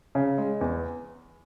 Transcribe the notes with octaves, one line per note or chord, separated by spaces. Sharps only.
C#3
G#3
E2